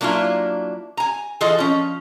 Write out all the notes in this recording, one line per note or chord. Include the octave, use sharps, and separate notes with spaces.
F#3 A#3 D4 E4 F4
G#5 A#5
E3 F4 G#4 A4 D#5
F3 C#4